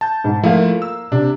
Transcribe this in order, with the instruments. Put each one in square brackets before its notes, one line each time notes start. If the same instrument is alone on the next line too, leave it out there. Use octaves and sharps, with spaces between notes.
[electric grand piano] A5 G6
[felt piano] G#2
[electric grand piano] F3 A3 E4 [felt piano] A#3 A#4 F5
[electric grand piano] E6
[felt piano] C3 [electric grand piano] D4